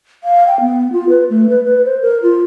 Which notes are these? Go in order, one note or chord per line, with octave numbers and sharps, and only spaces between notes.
F5
G5
B3
F4
B4
A3
B4
B4
C5
A#4
F4